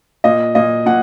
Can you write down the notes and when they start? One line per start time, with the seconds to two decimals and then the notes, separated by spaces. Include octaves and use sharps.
0.24 A#2 D#5
0.55 A#2 D#5
0.86 A#2 F#5